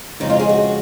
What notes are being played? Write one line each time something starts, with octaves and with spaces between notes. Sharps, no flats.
F2 C#3 G#3 D#4
F4
G#4
F#4